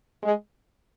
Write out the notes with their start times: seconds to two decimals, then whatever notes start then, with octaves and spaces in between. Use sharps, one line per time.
0.23 G#3